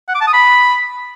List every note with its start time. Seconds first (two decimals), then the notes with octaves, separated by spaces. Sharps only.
0.08 F#5
0.15 D6
0.21 A5
0.27 D#6
0.33 B5